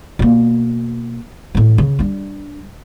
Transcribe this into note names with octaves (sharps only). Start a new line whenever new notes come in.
B2 A#3
A2 E3
C#3
G3 D4